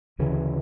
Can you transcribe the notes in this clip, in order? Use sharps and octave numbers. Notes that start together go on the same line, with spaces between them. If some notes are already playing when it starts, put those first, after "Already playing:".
D2 C#3 E3